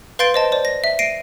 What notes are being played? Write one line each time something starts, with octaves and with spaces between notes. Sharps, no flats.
B4 F5 C6 G6 A6 D7
C5 D#5 A5
C5 D5
A#6
E5
A#6 C7 D7 D#7